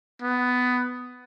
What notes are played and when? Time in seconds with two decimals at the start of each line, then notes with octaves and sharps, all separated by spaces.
0.22 B3